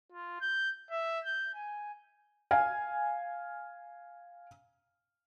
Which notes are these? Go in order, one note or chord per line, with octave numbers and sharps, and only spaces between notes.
F4
G6
E5
G6
G#5
F5 G#5